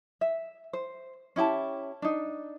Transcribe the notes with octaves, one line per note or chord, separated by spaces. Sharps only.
E5
C5
C#4 E4 G4 A5
D4 D#4